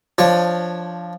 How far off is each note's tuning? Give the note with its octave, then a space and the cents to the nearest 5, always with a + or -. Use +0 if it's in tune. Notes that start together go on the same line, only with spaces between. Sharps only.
F3 +0 D4 +10 C#5 -10